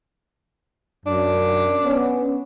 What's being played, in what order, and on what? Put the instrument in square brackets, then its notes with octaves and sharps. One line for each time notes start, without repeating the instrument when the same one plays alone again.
[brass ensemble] F#2 [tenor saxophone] D4
[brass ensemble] B3 C#4